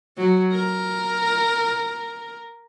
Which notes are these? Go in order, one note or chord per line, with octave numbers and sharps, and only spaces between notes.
F#3
A#4